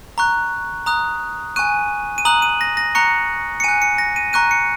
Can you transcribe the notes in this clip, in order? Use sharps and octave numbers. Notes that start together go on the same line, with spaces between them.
A#5 C#6 F#6
A#5 D#6 F#6
G#5 C#6 F#6 D#7
D#7
A#5 D#6 F#6 F#7
D#7
A#6
A#6
A#5 C#6 F#6 C#7
C#7
G#5 F#6 D#7
C#7
A#6
D#7
A#5 C#6 F#6 D#7
C#7